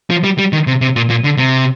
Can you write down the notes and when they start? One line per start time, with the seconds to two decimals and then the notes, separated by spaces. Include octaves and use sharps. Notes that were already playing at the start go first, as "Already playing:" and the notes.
0.10 F3
0.24 G3
0.38 G3
0.53 D#3
0.67 C3
0.81 C3
0.96 A#2
1.10 A#2
1.24 D3
1.38 C3